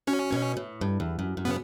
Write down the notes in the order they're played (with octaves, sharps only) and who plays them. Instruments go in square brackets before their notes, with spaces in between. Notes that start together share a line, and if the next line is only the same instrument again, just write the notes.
[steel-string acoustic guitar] F#2 [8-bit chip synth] C#4
[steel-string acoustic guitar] B2
A2
G2
E2
F#2
F#2
[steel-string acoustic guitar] C#3 [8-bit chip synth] B3